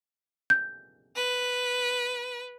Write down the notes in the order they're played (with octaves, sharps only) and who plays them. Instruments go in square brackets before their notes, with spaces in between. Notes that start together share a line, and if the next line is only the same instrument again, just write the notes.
[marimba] G6
[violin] B4